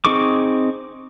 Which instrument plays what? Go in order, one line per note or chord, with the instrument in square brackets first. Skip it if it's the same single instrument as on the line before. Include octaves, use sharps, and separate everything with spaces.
[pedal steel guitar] C4 D#4 G#4 C#6 D6